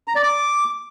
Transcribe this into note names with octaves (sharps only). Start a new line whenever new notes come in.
A#5
D5
D6